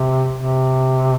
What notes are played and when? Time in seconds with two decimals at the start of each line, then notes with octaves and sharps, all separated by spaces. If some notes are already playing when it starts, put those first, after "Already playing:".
Already playing: C3
0.35 C3